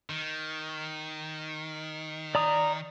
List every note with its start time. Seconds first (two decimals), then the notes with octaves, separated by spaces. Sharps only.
0.10 D#3
2.35 D5 A#5 D#6